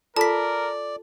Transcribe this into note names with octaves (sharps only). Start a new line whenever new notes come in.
F4 A4 A#4 D5 A5 B6